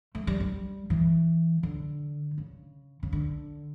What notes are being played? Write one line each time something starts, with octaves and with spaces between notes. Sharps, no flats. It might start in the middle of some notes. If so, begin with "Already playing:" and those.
A3
G3
G3
E3
D3
C#3
C#3
D3